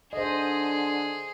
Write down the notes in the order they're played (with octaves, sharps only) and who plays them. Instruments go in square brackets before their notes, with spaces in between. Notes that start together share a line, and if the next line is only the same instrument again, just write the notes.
[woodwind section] D3 [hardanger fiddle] G#4 [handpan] C5 D#5